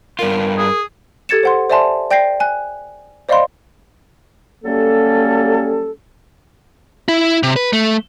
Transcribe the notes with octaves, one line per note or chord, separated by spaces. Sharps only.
G2 F4 A#4
G#4
G4 A4 G#6 A6 C#7 E7
C5 F#5 C6
C5 D5 E5 G#5 A5 C6
D5 G5 G6 A#6 C7
G#5 F#6
C5 D5 D#5 F5 B5 C6
F#3 G3 A#3 C#4 G4 A4
E4
C3
B4
A3